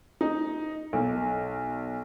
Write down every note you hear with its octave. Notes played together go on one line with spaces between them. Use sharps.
D#4
B1